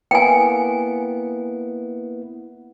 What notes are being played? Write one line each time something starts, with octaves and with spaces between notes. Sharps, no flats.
A#3 B3 E4 G5 G#5